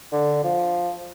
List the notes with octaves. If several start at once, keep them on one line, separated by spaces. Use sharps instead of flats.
D3
F3